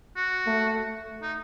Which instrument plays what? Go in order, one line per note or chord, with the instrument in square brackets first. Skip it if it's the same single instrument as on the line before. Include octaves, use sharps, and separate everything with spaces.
[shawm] F#4
[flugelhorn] A3
[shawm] D#4